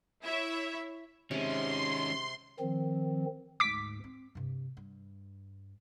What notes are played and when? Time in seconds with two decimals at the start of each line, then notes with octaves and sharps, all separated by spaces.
0.24 E4 C#5 E5
1.31 C3 D#3 G#3 C#4 C6
2.59 D#3 F3 C4
3.60 D2 G#2 D6 B6
4.04 C4
4.35 G2 C3
4.77 G2